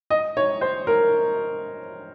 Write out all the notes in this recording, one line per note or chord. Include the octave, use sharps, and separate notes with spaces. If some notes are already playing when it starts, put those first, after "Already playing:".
D#5
C#5
C5
A#4